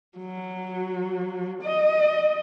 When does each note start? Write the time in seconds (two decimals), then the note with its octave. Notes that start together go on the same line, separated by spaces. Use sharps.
0.18 F#3
1.63 D#5